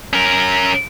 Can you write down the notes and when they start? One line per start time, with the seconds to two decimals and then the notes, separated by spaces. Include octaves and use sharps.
0.13 C#4 A#4